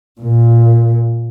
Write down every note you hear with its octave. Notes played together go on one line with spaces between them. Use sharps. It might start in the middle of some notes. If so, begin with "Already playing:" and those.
A#2